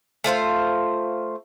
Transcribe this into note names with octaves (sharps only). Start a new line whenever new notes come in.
A3 F4 C5 F5